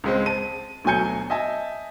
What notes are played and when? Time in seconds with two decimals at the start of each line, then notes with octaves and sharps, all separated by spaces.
0.04 C#2 G#3 C4
0.26 A5 D#7
0.84 D2 B2 F#3 G#5 G6 C#7
1.30 D#5 E5 G#5 A5